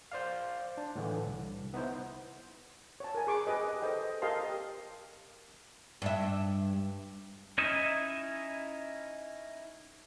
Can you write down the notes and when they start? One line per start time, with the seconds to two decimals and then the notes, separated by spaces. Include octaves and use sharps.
0.12 C5 D5 F5
0.78 D4
0.96 A2 D3 E3
1.26 C2
1.74 B3 D#4 E4 C5
3.00 C#5 A5
3.15 A#4 G#5
3.27 G#4 G#5 B5 C#6 D6
3.47 G4 B4 D#5
3.82 A4 C5 D#5 G5
4.22 G4 A#4 D#5 F5 A5 C6
6.02 G2 E5
7.58 C#4 D#4 E4 D#5 E5